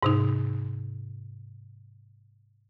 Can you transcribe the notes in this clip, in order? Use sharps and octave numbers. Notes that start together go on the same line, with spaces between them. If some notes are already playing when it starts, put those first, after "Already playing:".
G#2 C3 D#4